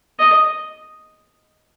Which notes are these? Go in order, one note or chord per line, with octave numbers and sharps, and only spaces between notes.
D#5